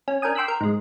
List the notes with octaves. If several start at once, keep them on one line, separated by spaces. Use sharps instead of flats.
C#4
D4 A#4 G5 G#5 D#6
G5 C6 D6 E6 F#6 B6
A#4
G#2 G#3